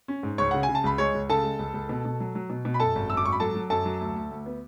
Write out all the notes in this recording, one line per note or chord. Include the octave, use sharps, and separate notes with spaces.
C#4
G#2
C#2 C#5 C#6
C#3 F#5
G#5
C#3
A5
C#2 B5
G#3 C#5 C#6
C#2
C#3 A4 A5
G#3
C#2
C#2
B2
B2
F#3
F#3
B2
B2
B5
F#2 A4 A5
G#1
F#2 E6
D6
G#1 C#6
B5
F#3 A4 A5
F#3
F#2 A4 A5
F#3
D2
D2
D2
B3